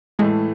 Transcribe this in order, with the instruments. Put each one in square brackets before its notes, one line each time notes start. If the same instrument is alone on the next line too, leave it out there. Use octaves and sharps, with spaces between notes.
[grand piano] A2 E3 A3 [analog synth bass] G#3